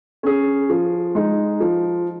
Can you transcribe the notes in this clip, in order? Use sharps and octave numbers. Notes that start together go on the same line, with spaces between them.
C#4 G#4
F3
G#3 D#4
F3